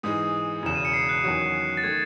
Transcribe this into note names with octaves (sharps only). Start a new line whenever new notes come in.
G#2 E3 G#3 D#6
E1 E2 C#3 E7
D#7
C#7
C7
F#6
E2 D#3 F#3 C#4 F#4
A6
D#3 A3 G#6